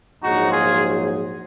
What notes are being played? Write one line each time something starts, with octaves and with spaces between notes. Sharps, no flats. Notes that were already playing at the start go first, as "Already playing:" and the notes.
A#1 G#2 F#3 D#4 F#4
F4 G#4